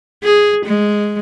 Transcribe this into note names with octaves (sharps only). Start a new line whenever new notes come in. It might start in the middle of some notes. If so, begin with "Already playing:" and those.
G#4
G#3